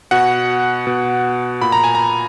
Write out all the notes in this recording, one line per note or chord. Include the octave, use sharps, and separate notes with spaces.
B2 F#5
B2
A#2 B5
A#5
G#5
A#5